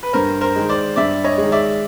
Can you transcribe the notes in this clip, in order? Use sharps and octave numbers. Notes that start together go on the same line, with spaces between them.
B4
G2 A#4 C5
A#4 C5
D#3 G#3
C5 D5
G2 D5 E5
C#5 D#5
D#3 G#3
D5 E5